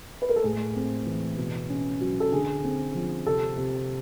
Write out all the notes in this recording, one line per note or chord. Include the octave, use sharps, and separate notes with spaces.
B4
A#4
A4
A2 G#4
C4
E3
B2
C#4
F#3
A4
D3 G#4
C4
F3
C3 A4
C3